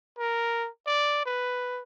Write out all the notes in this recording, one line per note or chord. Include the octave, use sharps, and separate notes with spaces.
A#4
D5
B4